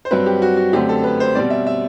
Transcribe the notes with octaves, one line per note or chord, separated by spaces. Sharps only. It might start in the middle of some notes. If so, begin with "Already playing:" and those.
C5
G2 F#3 C4 B4
G4
F#4
F#4
F#2 D3 A3 C4 G4
A4
B4
C5
B2 G3 C4 D5
E5
E5